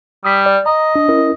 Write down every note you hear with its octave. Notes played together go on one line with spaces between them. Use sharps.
G3 D#6 B6
D5
D#5 A#5
D4
C#4 E4 A#4